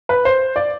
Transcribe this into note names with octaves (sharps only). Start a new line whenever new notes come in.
B4
C5
D5